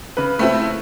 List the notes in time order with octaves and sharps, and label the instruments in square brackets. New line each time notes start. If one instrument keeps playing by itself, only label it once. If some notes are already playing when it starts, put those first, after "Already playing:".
[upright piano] C#3 B4
[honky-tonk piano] A3 C4 E4